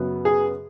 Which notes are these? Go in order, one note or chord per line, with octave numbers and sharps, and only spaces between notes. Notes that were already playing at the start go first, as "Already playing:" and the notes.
Already playing: F#2 C#3 F#3 B3
G#4